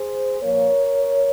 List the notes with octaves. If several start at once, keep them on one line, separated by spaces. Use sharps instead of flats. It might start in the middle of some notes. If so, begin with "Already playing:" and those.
Already playing: G#4 C5
A#2 F3 A#3 A#4 C#5